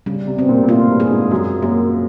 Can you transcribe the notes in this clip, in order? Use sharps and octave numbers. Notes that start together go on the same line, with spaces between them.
C#3 G3
C3
B2 C4
A#2
A#2
A2 F4
G2
G#4
G#2
F#2 F#3
F#2 A#3